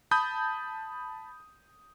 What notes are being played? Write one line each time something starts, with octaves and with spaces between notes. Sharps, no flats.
A5 B5 D#6 G6